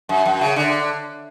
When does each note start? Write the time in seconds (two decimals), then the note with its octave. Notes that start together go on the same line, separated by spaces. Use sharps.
0.09 F#2
0.25 F#2
0.41 C#3
0.56 D3